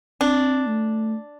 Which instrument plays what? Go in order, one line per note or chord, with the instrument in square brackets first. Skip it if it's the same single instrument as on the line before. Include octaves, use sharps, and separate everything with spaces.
[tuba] C4 [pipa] D4
[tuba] A3